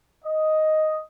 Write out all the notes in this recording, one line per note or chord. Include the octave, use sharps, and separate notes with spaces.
D#5